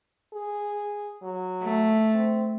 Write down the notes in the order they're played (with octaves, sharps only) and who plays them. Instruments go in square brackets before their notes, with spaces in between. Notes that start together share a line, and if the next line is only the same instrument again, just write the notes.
[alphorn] G#4
F#3
[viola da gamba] A3
[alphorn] C4